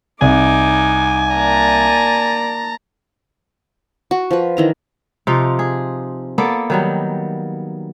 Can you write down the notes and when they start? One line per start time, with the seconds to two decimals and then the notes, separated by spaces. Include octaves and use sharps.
0.21 C2 D#4 G#5 D6
1.32 A#3 D5 A5 A#5
4.11 F#4
4.31 F3 B4
4.57 D#3 E3 A#5
5.27 C3 F3 D#4 F4
5.59 G#4
6.38 A#3 B3 A4 D5
6.70 D#3 F#3 G3